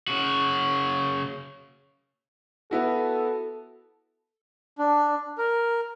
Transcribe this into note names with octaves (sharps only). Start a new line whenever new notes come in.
C#3 F#4
B3 E4 F#4 A4
D4
A#4